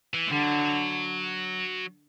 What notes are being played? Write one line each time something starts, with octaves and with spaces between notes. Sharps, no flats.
E3
D3 G3
F#3